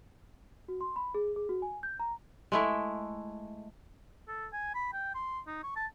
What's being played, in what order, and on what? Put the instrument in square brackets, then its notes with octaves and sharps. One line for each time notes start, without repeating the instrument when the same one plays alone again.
[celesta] F#4
C6
B5
G#4
G#4
F#4
G#5
G6
A#5
[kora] G#3 A3 E4
[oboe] A4
G#5
B5
G5
C6
D#4
C#6
A5